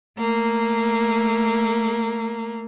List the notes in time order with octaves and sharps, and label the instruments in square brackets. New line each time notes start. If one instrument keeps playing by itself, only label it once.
[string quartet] A3 A#3